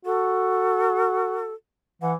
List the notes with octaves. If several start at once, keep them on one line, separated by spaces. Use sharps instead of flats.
F#4 A4
E3 F#5